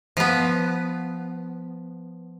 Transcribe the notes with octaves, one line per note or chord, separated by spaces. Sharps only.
F3 B3